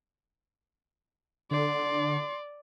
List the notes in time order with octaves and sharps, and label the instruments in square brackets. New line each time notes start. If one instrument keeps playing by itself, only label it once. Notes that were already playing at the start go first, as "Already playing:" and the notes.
[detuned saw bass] D3 [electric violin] D5 [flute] C6